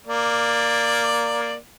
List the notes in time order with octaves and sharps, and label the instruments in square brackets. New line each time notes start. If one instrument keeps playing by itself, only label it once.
[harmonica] A#3 D5